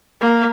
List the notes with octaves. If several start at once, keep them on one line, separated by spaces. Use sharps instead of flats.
A#3